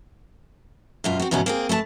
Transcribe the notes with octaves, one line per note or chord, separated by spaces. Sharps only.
F#2 B2 F4
C4 F#4
E2 G#2 B2 B3 C#4
A#3 C4 G#4
A3 B4 C5 A5